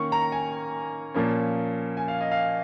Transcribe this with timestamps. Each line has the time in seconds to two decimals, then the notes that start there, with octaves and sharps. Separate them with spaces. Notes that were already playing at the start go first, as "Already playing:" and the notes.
Already playing: D#3 A#3 C#4 C#6
0.12 A#5
0.32 G#5
1.14 A#2 F3 A#3 C#4
1.97 G#5
2.08 F5
2.21 D#5
2.31 F5